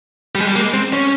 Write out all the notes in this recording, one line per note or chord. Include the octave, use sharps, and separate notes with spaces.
G3
G#3
G3
A#3
G#3
C4
C#4